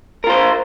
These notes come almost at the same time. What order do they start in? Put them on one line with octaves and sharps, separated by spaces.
A#4 F4 C5